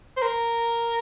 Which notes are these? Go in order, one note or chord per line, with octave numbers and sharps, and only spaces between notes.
C5
A#4